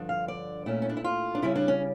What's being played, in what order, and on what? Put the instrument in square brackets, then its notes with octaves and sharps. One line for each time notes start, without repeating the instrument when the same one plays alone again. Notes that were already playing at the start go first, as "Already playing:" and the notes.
Already playing: [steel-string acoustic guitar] G2 D3 F3
F5
D5
A#2 A3 C#4 E4
C#4
D4
E4
F4
D4
C#3 G3 C#4 E4
D4
C#4